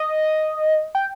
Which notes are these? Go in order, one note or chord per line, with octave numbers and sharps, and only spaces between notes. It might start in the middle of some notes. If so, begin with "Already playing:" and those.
Already playing: D#5
G5